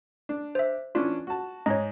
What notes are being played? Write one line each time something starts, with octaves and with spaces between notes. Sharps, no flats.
D4
C5 E5
E3 C#4 D4 F4
F#4 A5
G#2 D#4 C#5 D#5